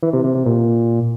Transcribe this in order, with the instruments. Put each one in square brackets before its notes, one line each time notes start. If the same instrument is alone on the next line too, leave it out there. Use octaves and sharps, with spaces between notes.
[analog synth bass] E3
C3
C3
C3
A#2